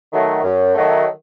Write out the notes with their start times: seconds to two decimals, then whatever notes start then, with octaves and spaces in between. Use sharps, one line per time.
0.12 D#3 F#3 A3
0.43 F#2
0.74 D#3 F#3 A3